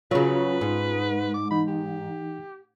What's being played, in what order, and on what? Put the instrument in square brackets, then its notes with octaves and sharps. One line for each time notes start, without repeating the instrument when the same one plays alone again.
[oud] C#3 F#3 [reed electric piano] C#4 F4 [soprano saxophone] B4
[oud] G#2
[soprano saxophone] D6
[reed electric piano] E3 D#4 [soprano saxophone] B5
[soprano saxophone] G4